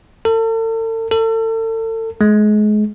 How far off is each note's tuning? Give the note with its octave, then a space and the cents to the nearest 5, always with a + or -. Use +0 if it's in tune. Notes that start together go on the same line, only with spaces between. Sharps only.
A4 +40
A4 +35
G#3 +30